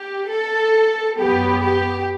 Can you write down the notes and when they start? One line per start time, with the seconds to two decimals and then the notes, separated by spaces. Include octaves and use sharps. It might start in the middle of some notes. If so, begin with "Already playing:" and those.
Already playing: G4
0.30 A4
1.19 F#2 F#3 B3 G4
1.63 G4